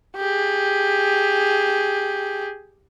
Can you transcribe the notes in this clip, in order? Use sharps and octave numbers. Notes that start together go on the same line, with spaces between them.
G4 G#4